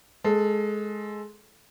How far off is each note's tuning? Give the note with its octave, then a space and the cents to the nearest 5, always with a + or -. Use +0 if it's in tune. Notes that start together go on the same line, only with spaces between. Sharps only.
G#3 +15 A4 +0